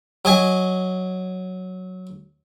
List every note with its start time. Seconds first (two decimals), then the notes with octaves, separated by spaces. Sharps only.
0.25 F#3 D#5 G#5